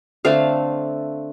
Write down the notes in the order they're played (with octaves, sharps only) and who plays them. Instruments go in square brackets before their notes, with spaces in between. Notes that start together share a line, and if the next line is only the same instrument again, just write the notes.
[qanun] D3 A3 C4 F5